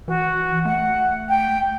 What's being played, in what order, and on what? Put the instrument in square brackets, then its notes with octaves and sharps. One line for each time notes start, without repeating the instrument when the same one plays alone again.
[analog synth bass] E3 [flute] F#4
[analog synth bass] A3 [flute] F#5
[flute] G5